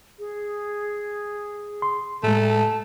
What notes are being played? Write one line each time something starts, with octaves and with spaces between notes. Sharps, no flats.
G#4
C6
A2 G#3 A3 A5